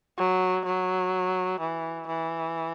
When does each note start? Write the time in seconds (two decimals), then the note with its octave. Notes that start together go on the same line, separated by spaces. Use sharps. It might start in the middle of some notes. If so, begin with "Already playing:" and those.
0.17 F#3
0.65 F#3
1.60 E3
2.07 E3